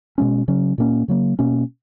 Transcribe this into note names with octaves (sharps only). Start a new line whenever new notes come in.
B2 G#3 C#4
C#3 F#3 C#4
A#2 A#3 C#4
C#3 F#3 A#3
B2 A#3 C#4